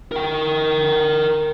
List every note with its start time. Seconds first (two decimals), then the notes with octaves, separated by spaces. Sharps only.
0.12 A#4 G5